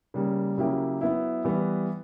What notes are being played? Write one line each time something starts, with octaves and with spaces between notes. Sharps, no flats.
C#3 G3 A#3
C#3 F#3 A#3 E4 G4
F#3 B3 E4
E3 G3 B3